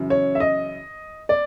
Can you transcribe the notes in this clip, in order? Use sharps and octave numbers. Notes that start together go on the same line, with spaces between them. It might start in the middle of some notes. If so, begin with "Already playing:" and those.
Already playing: F#2 C#3 E3
C#5
E5
D#5
D5